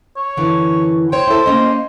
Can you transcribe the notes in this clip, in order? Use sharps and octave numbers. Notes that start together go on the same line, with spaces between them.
C#5
F#2 D3 E3
C5 C#5 G5
E4 A4
A#3 C#4 D#5